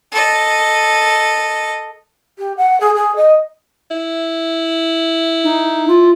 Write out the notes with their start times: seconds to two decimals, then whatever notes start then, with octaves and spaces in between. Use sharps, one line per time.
0.12 A4 D#5
2.38 G4
2.57 F#5
2.80 G#4
2.95 G#4
3.16 D#5
3.91 E4
5.44 D#4
5.88 F4